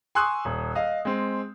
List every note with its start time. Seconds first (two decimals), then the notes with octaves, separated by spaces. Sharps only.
0.15 G#5 C6 C#6 D#6 E6 F#6
0.45 D#1
0.75 D#5 F5
1.05 G#3 C4